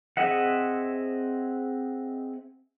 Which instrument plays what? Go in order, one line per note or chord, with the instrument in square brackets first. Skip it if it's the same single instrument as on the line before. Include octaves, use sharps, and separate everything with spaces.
[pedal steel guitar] C4 G#4 D#5 E5 F#5